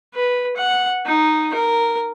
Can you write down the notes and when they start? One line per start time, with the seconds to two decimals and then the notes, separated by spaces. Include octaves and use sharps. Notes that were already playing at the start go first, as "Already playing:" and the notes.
0.14 B4
0.56 F#5
1.06 D#4
1.54 A#4